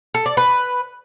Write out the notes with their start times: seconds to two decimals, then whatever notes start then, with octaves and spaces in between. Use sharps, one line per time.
0.14 A4
0.26 D5
0.37 B4